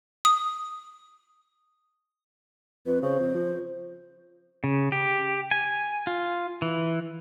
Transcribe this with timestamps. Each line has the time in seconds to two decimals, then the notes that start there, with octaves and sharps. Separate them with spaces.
0.25 D#6
2.86 F2 B4
3.02 C#3 C5
3.20 F2
3.34 F3
4.64 C#3
4.92 G4
5.51 G#5
6.07 F4
6.62 E3